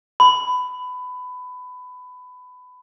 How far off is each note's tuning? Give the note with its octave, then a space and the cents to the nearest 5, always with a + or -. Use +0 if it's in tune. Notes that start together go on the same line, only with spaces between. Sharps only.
B5 +20